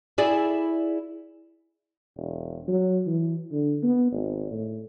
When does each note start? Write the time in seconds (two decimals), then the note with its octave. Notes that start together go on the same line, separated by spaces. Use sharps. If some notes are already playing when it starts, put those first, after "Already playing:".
0.18 E4 G#4 D5
2.16 E1
2.68 F#3
3.07 E3
3.52 D3
3.83 B3
4.12 G#1
4.51 A2